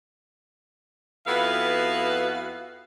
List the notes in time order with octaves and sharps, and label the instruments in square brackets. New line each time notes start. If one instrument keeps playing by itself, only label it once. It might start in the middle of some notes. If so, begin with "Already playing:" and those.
[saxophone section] F2 B3 E4 F#4 B4 F5